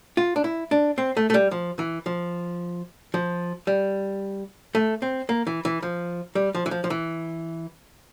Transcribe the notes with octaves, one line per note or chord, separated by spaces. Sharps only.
F4
D4
E4
D4
C4
A3
A3
G3
F3
E3
F3
F3
G3
A3
C4
A#3
E3
E3
F3
G3
F3
E3
F3
F3
E3